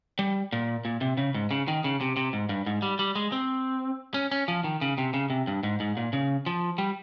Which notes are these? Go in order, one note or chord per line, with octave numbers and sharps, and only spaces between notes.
G3
A#2
A#2
C3
C#3
G#2
C#3
D#3
C#3
C3
C3
G#2
G2
G#2
G3
G3
G#3
C4
C#4
C#4
F3
D#3
C#3
C3
C#3
C3
G2
G#2
G#2
A#2
C#3
F3
G3